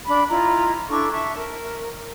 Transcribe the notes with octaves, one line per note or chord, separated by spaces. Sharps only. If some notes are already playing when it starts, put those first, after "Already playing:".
D4 B5
E4 F4 D#5 A#5
D4 E4 A4 C#6
E5 A5 C#6
A#4